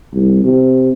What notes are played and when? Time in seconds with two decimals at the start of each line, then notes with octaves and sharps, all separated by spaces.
0.13 C2
0.44 C3